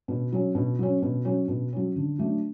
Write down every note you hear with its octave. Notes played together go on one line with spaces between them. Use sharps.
B2
F#3 C#4
B2
F#3 C#4
B2
F#3 C#4
B2
F#3 C#4
D3
F#3 A3 D4